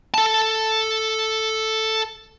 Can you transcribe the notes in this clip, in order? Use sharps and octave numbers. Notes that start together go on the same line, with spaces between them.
A4 A5